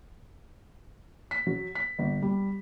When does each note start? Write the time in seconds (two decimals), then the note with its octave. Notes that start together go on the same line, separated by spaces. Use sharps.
1.31 B6
1.47 F#3
1.75 B6
1.99 G1
2.22 G3